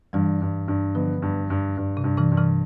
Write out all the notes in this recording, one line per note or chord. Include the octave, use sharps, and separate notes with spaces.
G2 E3 G3
G2
G2
D3 F3 B3
G2
G2
G2
C3
G2
C3 E3
G2
C3 E3